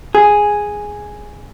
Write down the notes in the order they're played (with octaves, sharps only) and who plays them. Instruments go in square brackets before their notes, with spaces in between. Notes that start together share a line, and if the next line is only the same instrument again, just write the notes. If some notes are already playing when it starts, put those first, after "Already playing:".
[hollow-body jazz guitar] G#4